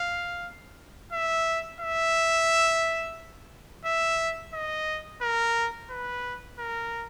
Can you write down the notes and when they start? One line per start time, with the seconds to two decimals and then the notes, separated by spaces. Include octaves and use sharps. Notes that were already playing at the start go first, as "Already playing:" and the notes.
Already playing: F5
1.12 E5
1.80 E5
3.85 E5
4.54 D#5
5.22 A#4
5.90 B4
6.59 A#4